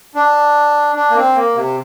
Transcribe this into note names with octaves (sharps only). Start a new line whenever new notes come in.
D4
D4
A#3
C4
A#3
C3